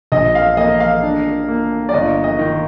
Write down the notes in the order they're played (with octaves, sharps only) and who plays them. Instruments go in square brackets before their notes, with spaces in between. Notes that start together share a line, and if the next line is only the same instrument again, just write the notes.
[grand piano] A#1 [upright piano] D#5
[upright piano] F5
[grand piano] A#3 [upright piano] D#5
[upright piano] F5
[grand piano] D4
A#3
[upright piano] D5
[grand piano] G1 [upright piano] D#5
[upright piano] D#5
[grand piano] D#3